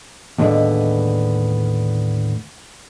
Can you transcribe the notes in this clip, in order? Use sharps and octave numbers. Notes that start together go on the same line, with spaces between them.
D#2 A2 D3 G#3 B3